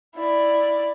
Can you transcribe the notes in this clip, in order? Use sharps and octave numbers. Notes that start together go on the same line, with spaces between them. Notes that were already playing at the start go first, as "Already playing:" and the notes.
E4 D5